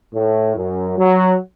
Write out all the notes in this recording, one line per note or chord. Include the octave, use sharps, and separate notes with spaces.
A2
F#2
F#3